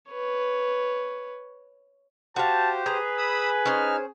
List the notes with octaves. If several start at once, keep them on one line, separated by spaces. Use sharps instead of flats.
B4 C#5
F#4 G4 C5 F5 A5
G#4 B4 A#5
B5 D#6 E6
C#4 D#4 C5 F6